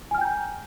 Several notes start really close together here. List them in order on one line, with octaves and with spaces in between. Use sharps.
G#5 F6 G5 G6 A#5